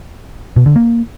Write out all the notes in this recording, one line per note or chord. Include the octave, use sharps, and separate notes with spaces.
B2
D3
A#3